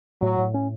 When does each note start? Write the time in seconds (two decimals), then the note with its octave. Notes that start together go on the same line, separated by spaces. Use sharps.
0.22 A2 F#3
0.38 A2
0.54 C#4